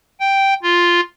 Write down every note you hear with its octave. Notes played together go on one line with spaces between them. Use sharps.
G5
F4